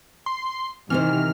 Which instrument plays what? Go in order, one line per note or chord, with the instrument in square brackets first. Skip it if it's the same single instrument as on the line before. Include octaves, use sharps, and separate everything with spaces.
[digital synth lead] C6
[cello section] C3 D#3 [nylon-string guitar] E3 C4 C5 [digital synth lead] F6